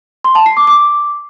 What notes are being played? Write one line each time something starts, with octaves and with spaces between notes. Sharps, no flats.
C6
A5
C7
D6
D6